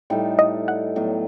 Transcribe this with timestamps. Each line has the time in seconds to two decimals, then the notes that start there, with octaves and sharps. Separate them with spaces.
0.10 A2 G3 D#4 A4
0.39 D#5
0.68 F#5
0.96 A2 F#3 B3